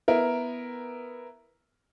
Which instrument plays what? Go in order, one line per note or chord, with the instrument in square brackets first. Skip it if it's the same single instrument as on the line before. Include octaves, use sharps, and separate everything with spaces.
[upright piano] B3 E4 A#4